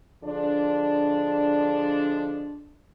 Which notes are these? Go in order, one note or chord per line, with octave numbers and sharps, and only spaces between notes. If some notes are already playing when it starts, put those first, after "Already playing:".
D3 F3 G#3 D4